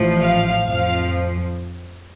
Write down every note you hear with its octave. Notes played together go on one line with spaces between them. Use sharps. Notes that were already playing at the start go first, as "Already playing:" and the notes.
Already playing: A1 A2 F3
F5
F2 F3 F5